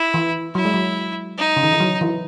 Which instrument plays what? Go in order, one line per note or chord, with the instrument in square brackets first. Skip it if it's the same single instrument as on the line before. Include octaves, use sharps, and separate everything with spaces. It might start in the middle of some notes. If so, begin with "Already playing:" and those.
Already playing: [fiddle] E4
[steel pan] E3
[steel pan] F#3 [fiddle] E4
[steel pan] G#3
F#3
[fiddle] D#4
[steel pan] C#3
D#3
E3
F#3
E3